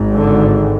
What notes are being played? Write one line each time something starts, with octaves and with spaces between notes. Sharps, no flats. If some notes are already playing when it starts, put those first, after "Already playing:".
Already playing: G#1 G#2
D3